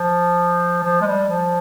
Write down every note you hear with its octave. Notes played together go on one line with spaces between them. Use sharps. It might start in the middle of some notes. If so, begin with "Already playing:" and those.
Already playing: F3
F3
G#3
G3
F3